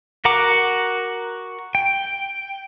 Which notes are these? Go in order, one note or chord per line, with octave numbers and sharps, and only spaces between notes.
F#4 A#4 F#5 A#5 D6
G5